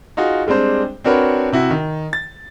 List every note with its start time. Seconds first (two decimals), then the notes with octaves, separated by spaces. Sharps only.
0.17 D#4 F4 F#4 G#4
0.47 G3 G#3 C4 D4 C5
1.04 C4 D4 F#4 A#4 B4 C#5
1.52 C3 E4 F#4
1.70 D#3
2.13 A6